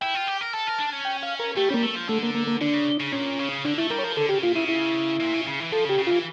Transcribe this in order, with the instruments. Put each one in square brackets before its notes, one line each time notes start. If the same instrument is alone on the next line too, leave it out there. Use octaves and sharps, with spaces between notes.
[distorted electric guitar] E4 [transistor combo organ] G5
[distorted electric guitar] F4
G4
A#4
[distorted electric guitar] A4 [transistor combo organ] A5
[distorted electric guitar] A#4
D4
C#4
[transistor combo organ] G5
F5
A#4
[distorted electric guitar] A3 [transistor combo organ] G4
[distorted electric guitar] G3 [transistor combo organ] C#4
[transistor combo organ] A#3
[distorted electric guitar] A3
F3
[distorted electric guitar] D3 [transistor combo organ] A3
[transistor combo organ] A#3
A#3
A#3
[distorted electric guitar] D3 [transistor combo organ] D4
[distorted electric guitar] C#3
C#3
[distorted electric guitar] A#2 [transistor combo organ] C#4
[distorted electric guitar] C#3
[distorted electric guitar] D3 [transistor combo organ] D4
[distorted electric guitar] A3 [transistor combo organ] E4
[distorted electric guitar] G3 [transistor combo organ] A#4
[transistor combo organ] C#5
[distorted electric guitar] F3 [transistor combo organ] A#4
[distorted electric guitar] D3 [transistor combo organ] A4
[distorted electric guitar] C#3 [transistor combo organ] G4
[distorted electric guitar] A#2 [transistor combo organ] F4
[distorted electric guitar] C#3 [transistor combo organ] E4
[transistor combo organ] E4
[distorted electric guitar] A#2
C#3
C#3
E3
[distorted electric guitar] F3 [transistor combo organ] A4
[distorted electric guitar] C#3
[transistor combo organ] G4
[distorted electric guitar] C#3
[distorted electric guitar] E3 [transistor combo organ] F4